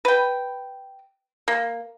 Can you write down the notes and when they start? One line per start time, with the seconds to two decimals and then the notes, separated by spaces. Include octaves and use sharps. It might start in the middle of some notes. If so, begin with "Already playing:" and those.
0.05 B4 G5
1.48 A#3